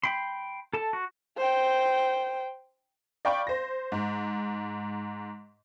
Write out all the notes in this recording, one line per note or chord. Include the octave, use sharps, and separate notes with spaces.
G5 B5 C6
A4 A5
F#4
C5 G5
D5 F5 G5 B5 C#6
C5 A#6
G#2